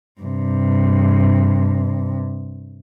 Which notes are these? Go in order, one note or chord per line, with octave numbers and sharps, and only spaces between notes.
G2 C3